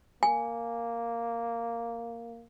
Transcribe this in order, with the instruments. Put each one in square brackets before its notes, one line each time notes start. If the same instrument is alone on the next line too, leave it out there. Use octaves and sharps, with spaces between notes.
[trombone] A#3 [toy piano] G#5